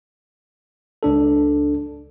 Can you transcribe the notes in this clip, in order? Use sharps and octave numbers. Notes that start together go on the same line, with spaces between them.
C#2 D4 A4